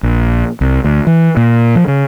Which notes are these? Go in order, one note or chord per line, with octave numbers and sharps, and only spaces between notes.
A#1
C2
D2
E3
A#2
F3
C#3